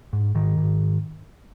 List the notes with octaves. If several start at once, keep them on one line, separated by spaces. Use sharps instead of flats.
G#2
G#2 D#3
G#2